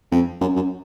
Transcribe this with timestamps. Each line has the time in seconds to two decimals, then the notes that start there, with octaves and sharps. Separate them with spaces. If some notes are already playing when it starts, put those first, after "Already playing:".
0.12 F2
0.41 F#2
0.56 F#2